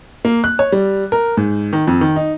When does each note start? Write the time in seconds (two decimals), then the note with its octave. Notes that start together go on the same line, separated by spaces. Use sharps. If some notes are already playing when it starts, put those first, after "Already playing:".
0.25 A#3
0.44 F#6
0.59 C#5
0.72 G3
1.12 A#4
1.37 G#2
1.73 D#3
1.87 F2
2.01 D#3
2.16 D#4